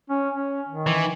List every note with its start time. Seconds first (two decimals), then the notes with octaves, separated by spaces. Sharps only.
0.10 C#4
0.36 C#4
0.68 D#3
0.87 E3